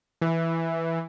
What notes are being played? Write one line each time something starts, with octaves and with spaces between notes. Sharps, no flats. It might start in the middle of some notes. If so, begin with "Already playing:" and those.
E3